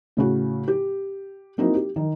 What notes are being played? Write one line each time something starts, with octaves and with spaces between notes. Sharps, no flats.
A2 C#3 F#4
G4
A#3 C4 D#4 E4 F#4
G4
D#3